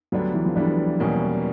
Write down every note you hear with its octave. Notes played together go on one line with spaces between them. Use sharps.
D2 D3 F#3 G3 B3 D4
E3
F3
D2 D3 E3 G3 B3 D4
E2 B2 G3 A#3 C#4